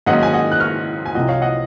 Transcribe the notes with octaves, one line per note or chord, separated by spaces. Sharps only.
G#2 D#3 F#3 A#3 C#4 D#5 F#5
G#5
D#5 F#5
F#6
C#6 F6
G#5
C2 C3 F3 D#5 F#5
C#5 F5
D#5 F#5